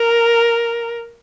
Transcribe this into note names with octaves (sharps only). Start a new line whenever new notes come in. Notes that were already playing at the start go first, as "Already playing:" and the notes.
Already playing: A#4